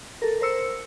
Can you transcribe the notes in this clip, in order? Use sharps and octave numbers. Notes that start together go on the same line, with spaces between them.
A4 A#4
A#4 C5 E6 C#7